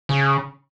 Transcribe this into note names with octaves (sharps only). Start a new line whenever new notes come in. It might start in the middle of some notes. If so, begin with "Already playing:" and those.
C#3